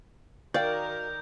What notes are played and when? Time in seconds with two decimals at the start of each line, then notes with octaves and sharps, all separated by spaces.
0.54 D#3 F#4 A#4 D5 F5 G5 G6